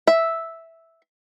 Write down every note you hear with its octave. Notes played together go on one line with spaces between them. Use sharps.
E5